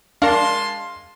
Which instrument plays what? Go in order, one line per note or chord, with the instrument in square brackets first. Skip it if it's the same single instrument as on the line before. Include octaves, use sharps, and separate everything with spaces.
[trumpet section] G#3 A5 C6 [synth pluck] D4 A#4 [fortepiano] F5